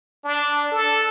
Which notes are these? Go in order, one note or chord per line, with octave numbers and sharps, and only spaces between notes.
D4
A4